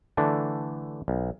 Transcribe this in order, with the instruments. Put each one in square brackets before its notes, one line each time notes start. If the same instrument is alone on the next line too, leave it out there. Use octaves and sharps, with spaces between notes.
[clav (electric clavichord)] D3 E3 A3 D4
B1